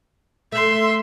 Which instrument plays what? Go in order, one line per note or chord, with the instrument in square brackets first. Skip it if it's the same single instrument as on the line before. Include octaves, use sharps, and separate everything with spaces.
[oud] A3 [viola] E5 C6